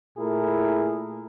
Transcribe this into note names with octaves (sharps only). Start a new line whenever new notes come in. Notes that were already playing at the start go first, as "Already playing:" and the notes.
A#2 A3 E4 G#4 A#4